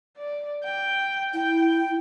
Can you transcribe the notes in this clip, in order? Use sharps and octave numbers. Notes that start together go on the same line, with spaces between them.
D5
G5
E4 G5